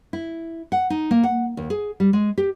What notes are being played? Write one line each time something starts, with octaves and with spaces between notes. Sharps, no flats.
E4
F#5
D#4
A#3
F#5
D#2
G#4
G3
G#3
G4